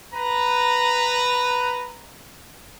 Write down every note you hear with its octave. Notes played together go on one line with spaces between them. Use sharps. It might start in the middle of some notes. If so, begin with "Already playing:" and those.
B4 A#5